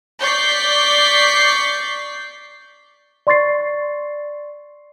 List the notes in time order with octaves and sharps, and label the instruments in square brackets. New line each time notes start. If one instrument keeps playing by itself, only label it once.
[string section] D5 C#6 G6 B6 C7
[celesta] D5 C6 C#6 A6 C7